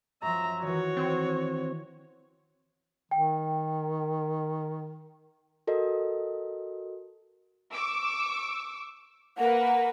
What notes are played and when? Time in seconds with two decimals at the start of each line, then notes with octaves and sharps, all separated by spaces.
0.22 F#2 F3 E5 A#5
0.62 D#3 E3 F#4 C#5
0.97 C4 C#7
3.11 D#3 G5
5.67 F#4 A4 A#4 D#5
7.73 C#6 D6 E6
9.38 A#3 A#4 B4 F#5